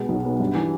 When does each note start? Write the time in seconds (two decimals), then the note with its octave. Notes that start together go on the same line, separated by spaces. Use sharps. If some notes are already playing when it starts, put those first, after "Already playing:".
Already playing: B2 G#3 B3
0.09 B1
0.25 B3
0.40 G2
0.55 E3